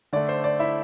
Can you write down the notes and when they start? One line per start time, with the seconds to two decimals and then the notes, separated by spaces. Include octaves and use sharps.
0.13 D3 A3 D5
0.29 C5
0.44 D5
0.59 E4 E5